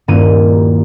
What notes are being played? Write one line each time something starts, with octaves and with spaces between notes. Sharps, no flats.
D#1 G2 A#3 E4 D#7